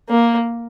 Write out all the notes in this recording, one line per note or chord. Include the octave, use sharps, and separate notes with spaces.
A#3